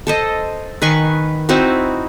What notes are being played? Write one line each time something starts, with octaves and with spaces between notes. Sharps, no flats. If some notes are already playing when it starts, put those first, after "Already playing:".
A4 C5 D#5
D#3 B4 G#5 C#6
C4 D#4 E4 F#4